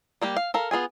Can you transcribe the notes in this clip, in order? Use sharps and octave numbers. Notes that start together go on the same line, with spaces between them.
G3 A#3 G4
F5
A4 A#4 F5
B3 F4 G#4 G#5